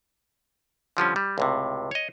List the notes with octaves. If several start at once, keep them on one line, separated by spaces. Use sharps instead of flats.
D3 F3 G3 C#4
G3
C#2 A2 C3
C#5 D#5